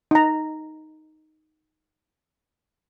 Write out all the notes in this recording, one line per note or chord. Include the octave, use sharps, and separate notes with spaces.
D#4 A#5